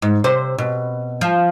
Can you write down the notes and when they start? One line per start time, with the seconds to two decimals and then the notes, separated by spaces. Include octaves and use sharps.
0.02 G#2
0.24 C3 C5
0.58 B2
1.21 F3